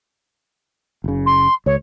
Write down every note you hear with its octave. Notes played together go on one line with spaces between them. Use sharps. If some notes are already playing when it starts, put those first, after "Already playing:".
F#1 C#3
C6
C#2 C#5